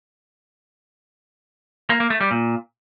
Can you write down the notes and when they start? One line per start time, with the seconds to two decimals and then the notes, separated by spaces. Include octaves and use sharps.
1.90 A#3
2.00 A#3
2.10 A3
2.21 G3
2.31 A#2